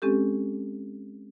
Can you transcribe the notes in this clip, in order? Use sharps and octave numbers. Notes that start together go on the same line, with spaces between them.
G#3 C4 C#4 G4 A4